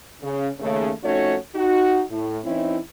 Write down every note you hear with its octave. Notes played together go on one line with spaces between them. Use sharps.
C#3
D#2 C#3 A3
F2 A3 C#4 D#4 F#4 C#5
D#4 F#4
A2
E3 C4 C#4 D#4 E4